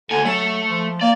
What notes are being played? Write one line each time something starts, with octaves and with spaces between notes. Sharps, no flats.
D2 D3 G#5
F#3 A3 A4
F3
A#3 D5